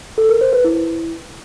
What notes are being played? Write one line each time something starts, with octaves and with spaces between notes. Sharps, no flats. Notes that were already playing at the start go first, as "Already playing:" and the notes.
A4
A#4
C5
B4
E4